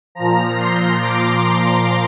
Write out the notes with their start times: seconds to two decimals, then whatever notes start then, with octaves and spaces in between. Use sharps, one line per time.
0.15 A#2 F3 A#5
0.58 C6
1.01 D6
1.44 C6